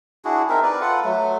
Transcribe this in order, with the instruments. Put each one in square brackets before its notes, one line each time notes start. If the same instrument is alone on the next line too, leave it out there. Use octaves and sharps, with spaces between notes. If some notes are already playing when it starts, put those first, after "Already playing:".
[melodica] D4 E4 F#4 G#4
C4 D#4 A#4 E5
B4 D5
F4 A4 B4 F#5
F#3 A3